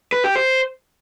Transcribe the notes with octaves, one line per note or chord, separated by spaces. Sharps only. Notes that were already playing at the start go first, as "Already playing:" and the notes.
B4
G4
C5